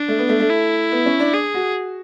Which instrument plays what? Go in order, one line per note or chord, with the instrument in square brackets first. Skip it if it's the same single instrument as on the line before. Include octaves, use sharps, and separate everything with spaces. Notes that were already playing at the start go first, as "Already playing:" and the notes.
Already playing: [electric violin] D4
[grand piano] A3
B3
A3
A3
[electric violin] E4
[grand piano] B3
C#4
D4
[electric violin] G#4
[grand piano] F#4